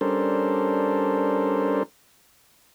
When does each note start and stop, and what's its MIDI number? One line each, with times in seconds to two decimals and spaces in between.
0.01 1.83 55
0.01 1.83 61
0.01 1.83 62
0.01 1.83 69
0.01 1.83 70
0.01 1.83 72